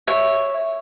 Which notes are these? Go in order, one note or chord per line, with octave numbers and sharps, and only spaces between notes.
C#5 E5